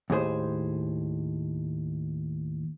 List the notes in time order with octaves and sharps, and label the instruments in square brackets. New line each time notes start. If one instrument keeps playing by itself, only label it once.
[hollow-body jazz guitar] D#2 A2 G#4 C5